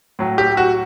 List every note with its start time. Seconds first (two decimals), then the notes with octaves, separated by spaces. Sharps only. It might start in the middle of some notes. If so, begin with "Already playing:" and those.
0.19 A2 F#3
0.38 G4
0.57 F#4